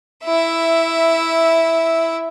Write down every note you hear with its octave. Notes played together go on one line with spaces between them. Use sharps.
E4 E5